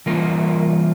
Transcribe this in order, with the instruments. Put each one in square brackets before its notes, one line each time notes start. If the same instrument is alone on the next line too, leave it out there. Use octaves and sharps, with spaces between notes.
[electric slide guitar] E3 G3 A#3 F4 A#4